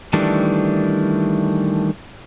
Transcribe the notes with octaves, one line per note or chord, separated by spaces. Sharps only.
D#3 E3 G3 A3 D4